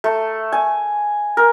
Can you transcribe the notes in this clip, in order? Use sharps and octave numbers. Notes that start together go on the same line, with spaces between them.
A3
G#5
A#4